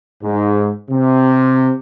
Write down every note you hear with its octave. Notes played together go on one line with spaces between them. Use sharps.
G#2
C3